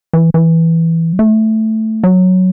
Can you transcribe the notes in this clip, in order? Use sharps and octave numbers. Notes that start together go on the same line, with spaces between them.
E3
E3
F#3
A3
F#3